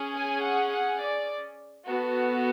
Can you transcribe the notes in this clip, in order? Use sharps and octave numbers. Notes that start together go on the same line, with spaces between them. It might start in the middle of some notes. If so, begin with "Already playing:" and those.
Already playing: C#4 G#4
G#5
F#5
F#5
D5
B3 F#4 A4